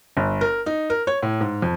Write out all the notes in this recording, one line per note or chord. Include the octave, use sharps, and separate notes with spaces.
G1
A#4
D#4
A#4
C#5
A2
G#2
F2